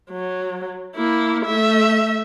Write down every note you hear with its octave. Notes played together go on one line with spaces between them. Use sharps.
F#3
A#3 E4
A3 E5